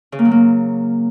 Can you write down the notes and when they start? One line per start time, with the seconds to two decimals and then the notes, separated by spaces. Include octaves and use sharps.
0.12 C#3
0.19 A#3
0.25 F#3
0.31 A#3